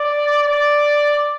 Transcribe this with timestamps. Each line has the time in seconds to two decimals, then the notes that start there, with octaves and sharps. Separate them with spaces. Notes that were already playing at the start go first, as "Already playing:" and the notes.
Already playing: D5
0.48 D5